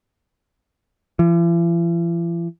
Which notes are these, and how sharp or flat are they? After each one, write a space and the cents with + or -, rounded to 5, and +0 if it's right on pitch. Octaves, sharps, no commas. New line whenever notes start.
E3 +45